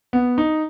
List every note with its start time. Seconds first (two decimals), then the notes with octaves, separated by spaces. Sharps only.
0.13 B3
0.38 D#4